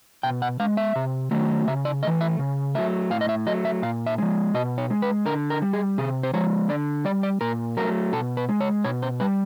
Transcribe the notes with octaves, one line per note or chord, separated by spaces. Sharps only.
B2 G5
F#5
G#3 F5
E5
C3
D#3 F#3 A3
C#3 E5
D5
E3 A3 D#5
E5
C#3
F#3 A3 E5
A2 F5
D#5
E5
F#3 A3 D#5
E5
A#2 F5
E5
F3 G#3
B2 D#5
C#5
G#3
B4
D3 A#4
A#4
G3
G#4
C3 G#4
C5
F3 G#3 C#5
D3 D5
G3 D5
D5
A#2 A#4
F#3 A3 A#4
B2 A4
B4
G#3
C#5
B2 C#5
C5
G3 B4